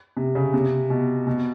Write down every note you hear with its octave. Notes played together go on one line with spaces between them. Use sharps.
C3
C#3
C3
B2
B2